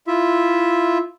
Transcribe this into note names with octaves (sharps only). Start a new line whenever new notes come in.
E4 F4 E5